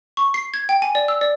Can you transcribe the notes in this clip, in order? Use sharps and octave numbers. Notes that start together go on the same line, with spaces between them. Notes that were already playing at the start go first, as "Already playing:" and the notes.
C#6
C7
G#6
G5
G#5
D5
E6
D5